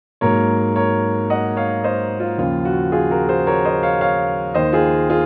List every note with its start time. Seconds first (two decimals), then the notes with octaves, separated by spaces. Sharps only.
0.21 G#2 F#3 A#3 A#4 C#5
0.76 A#4 C#5
1.30 D#5 F#5
1.57 C#5 F5
1.84 C5 D#5
2.20 F4
2.38 D#2 C#3 F3 F4
2.65 F#4
2.92 F4 G#4
3.11 F#4 A#4
3.28 G#4 C5
3.47 A#4 C#5
3.65 C5 D#5
3.83 C#5 F5
4.01 C#5 F5
4.54 D#2 D#3 A#3 C5 D#5
4.73 F4 G#4
5.10 F4 G#4